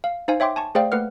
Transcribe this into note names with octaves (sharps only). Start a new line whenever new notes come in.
F5
D#4 C5 F5 G#5
C#5 E5 G5 C6 D6
G#5 A5 C#6
A3 G#4 C5 D5 F5 G5
A3 A#3 B4 F#5 F6